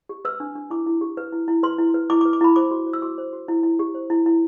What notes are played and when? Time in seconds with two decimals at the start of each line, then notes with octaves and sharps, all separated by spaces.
0.09 G4
0.25 B4 E6
0.40 D4
0.55 D4
0.70 E4 D6
0.86 E4
1.01 G4
1.17 B4
1.33 E4
1.48 E4
1.63 B4 C6
1.79 E4
1.94 B4
2.10 E4 D6
2.21 D6
2.25 B4
2.33 D6
2.41 E4 B5
2.56 C5 D6
2.71 F#4
2.86 C5
2.93 E6
3.02 F#4 D6
3.18 C5
3.33 F#4
3.48 E4
3.63 E4
3.79 G4
3.94 C5
4.10 E4
4.26 E4